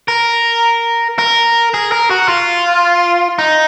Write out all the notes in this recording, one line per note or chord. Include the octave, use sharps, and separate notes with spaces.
A#4
A#4
G#4
A#4
F#4
F4
D#4